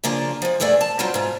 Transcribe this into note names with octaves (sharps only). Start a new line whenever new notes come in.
C#3 F3 A#3 D4 F4
F3 G#3
E2 G2 A3 G#4 D5
A5
F#3 G3 C4 D#4 F4
G#2 F4